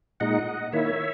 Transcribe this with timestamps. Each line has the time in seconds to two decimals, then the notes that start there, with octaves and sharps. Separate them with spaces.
0.20 A#2 G#3 D#4 D#5 F#5
0.72 D#3 A#3 E4 C#5 E5